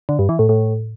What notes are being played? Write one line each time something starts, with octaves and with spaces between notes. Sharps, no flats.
D3
G2
E3
A2
A2